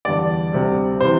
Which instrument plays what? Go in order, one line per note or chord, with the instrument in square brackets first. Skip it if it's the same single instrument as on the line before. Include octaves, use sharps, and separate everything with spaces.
[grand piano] E2 D3 G3 D5
D2 C3 G3
C3 E3 C5